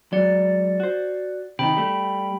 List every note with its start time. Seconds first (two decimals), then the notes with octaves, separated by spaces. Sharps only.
0.13 F#3 G#3 D5 C#7
0.80 F#4 C5
1.59 C3 D#3 D#4 G5 B5
1.77 G3 A3